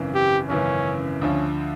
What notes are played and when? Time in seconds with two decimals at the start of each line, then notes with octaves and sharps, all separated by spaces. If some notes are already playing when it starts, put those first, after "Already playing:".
Already playing: G#1 F#2 C#3 E3
0.15 G4
0.49 G#1 F#2 C#3 E3 C#4
1.21 D2 D3 F3 C#4